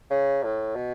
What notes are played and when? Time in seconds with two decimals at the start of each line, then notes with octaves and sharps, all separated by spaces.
0.10 C#3
0.44 A2
0.75 B2